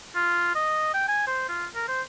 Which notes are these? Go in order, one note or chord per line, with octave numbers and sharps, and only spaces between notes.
F4
D#5
G5
G#5
C5
F4
A#4
C5